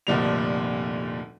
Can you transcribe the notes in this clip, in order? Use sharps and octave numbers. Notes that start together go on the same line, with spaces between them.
F1 D2 A#2 F3 G3 F7